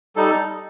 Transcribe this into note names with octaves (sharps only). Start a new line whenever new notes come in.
G3 D#4 A4